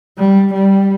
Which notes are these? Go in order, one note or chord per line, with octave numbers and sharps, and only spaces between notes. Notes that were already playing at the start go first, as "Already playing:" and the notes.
G3
G3